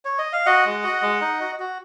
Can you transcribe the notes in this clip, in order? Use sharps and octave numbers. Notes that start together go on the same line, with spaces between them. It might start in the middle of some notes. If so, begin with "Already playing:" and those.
C#5
D#5
F5
F#4 D#5 F#5
G#3
F#4
G#3
D#4
F#4
F#4